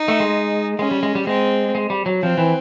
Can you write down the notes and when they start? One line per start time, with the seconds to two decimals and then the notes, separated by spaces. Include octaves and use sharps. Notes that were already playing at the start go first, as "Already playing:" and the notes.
Already playing: D#4
0.08 A3
0.20 G#3
0.79 G#3 C#4
0.91 G3
1.03 G#3
1.15 G3
1.27 G#3 C4
1.75 G#3
1.90 G3
2.06 F#3
2.23 F3 C4
2.38 E3